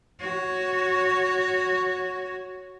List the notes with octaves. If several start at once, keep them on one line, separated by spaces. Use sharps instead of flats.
F#4 C#5